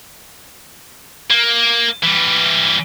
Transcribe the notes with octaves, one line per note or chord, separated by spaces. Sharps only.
A#3
E3 G3